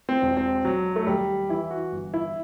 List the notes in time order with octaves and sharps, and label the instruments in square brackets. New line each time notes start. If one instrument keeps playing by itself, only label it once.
[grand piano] C4
E1
C4
E1 F#3
A3
D#2 G3
E3 E4
F#4
G1
E4